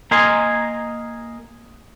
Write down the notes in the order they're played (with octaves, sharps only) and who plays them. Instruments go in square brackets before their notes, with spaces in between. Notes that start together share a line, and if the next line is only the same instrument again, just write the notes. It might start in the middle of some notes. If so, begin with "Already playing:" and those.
[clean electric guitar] A#3 A#4 D#5 G#5 C6